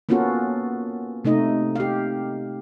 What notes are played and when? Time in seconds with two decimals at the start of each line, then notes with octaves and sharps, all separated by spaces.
0.09 A#3 B3 C#4 F4 F#4 A4
1.25 C3 A3 D#4 D#5
1.76 G4 F5